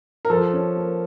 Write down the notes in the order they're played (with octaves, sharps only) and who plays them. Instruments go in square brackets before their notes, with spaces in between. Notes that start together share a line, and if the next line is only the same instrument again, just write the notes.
[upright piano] A#4
[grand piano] F3 [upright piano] A4
[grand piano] C#4
A#3